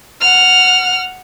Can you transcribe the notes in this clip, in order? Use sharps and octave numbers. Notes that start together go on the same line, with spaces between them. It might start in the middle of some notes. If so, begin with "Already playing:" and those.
F#5 F6